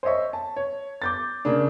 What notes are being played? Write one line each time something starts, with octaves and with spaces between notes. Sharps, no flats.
C5 C#5 D#5 E5 C#6
A5
C#5
D6 G6 A6
C#3 A#3 D4